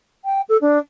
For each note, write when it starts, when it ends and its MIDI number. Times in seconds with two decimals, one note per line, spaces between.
0.25 0.41 79
0.49 0.57 69
0.61 0.78 62